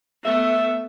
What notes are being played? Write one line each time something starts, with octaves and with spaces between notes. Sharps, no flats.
A3 B3 E5